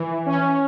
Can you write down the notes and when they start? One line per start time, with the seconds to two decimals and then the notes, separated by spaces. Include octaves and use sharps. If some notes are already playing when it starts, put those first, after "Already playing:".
Already playing: E3
0.26 C#4